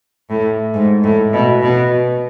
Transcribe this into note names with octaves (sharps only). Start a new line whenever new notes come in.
A2
G#2
A2
B2
B2